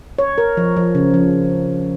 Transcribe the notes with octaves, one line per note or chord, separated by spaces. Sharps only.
C#5
A#4
F3
F3
C#3
F3